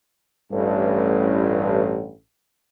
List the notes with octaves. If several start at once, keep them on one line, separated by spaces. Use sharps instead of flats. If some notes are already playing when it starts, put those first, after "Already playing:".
A1 G2